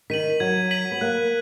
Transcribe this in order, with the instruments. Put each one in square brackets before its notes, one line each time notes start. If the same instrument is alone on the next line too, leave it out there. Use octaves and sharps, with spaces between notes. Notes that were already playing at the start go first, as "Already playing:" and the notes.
[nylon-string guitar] D#3 [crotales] B6 D#7 F#7
[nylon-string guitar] F#3 [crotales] G#6
[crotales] B6 D#7 F#7
[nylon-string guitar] B3
[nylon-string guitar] A#3 [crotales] F#6